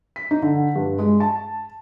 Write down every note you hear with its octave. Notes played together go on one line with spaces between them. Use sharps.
B6
D#4
D3
G2
G#3
A5